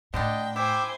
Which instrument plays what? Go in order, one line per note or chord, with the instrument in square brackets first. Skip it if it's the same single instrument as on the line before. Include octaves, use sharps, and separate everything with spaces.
[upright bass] A2 [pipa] D3 G3 D4 [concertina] D#5 [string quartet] G5
[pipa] E4 [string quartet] C5 G#5 [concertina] G5 D6 E6